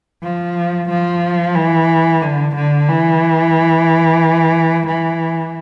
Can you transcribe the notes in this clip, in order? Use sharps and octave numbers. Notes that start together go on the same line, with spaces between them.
F3
F3
E3
D3
D3
E3
E3